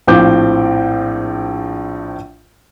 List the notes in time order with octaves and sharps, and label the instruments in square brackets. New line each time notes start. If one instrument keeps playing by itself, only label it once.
[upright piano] A#1 A2 C4 F4 D6 G6